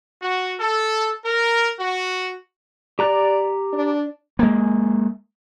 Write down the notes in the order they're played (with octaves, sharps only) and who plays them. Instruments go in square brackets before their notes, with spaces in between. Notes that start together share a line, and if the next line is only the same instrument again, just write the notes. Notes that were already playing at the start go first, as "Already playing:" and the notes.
[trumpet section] F#4
A4
A#4
F#4
[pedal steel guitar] G4 A#5 F#6 [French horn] D5
[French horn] D4
[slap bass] G#3 A#3